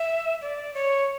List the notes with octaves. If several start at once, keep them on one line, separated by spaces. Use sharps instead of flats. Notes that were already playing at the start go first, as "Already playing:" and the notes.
Already playing: E5
D5
C#5